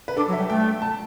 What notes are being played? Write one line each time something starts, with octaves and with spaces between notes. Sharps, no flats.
B4
D4 A4
F#3
E5
G3
A3 G5
A5